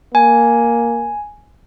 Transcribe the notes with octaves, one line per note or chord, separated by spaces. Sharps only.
A#3 G#5